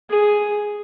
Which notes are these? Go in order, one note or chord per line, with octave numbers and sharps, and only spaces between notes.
G#4